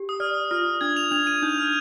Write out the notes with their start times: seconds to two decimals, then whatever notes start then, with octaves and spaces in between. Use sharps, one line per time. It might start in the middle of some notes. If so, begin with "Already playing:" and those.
Already playing: G4
0.09 D#6
0.20 D5 F6
0.51 F4 F6
0.81 D4 G#6
0.96 F7
1.12 D4 F7
1.27 D#7
1.42 D#4 G6
1.58 F6